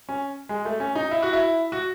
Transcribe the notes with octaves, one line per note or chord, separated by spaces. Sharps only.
C#4
G#3
A3
C#4
D#4
E4
F#4
E4
F#4